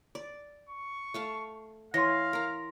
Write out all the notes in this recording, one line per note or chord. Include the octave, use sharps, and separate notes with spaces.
D5
C#6
A3 F5 A5
E3 C#5 D#5 F5 C6 A#6
A#4 A#5